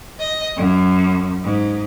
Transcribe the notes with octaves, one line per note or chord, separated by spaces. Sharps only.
D#5
F#2
G#2